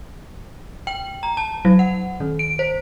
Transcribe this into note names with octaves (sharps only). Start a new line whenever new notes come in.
G5
A#5
A5
F#3
F#5
D#3
D7
C5